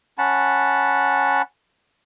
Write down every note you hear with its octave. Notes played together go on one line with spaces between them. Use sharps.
C#4 F#5 A5 B5